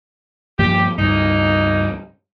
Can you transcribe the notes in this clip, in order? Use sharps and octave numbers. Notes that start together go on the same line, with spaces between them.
G2 F3 A#3 G4
C#2 G2 A#3 D#4